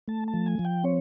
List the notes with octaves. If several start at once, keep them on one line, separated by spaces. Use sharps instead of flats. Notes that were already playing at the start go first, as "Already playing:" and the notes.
A3 A5
A5
F3
G#5
F3
G5
C4 C#5